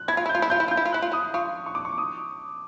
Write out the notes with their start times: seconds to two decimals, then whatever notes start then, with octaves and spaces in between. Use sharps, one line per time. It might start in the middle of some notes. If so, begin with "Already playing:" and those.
Already playing: F#6
0.08 E4 G#6
0.17 F4
0.26 E4
0.29 G6
0.35 F4
0.42 E4
0.50 F4 G6
0.60 E4
0.68 F4 G6
0.77 E4
0.85 F4
0.93 E4 F#6
1.02 F4
1.12 E4 D#6
1.34 F4 C#6
1.66 C#6
1.75 D6
1.85 C#6
1.98 D#6